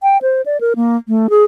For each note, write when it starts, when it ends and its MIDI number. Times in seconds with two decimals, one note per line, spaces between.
0.03 0.18 79
0.22 0.42 72
0.46 0.60 74
0.61 0.73 70
0.76 0.97 58
1.08 1.27 57
1.30 1.44 68